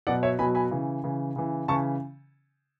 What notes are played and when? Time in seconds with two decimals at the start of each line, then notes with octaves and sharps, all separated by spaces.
0.07 B2 F#3 D5 F#5
0.23 C#5 E5
0.39 B2 G#5 B5
0.43 F#3
0.55 G#5 B5
0.71 C#3 E3
1.04 C#3 E3
1.36 C#3 E3
1.68 C#3 E3 A5 C#6